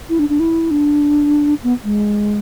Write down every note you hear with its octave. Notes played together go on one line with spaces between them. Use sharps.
E4
D4
D4
E4
D4
B3
G#3